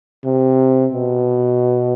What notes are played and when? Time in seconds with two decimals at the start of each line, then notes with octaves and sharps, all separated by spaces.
0.25 C3
0.92 B2